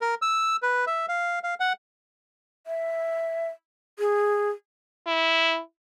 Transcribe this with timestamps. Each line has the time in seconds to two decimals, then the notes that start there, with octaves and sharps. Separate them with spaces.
0.01 A#4
0.22 E6
0.62 B4
0.87 E5
1.08 F5
1.43 F5
1.60 F#5
2.67 E5
3.99 G#4
5.07 E4